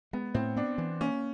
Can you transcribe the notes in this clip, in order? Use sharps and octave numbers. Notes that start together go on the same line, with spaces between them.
G#3 B3
A2 C4
B3 D4
E3
A#3 C#4